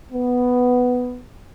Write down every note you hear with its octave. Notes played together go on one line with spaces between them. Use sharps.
B3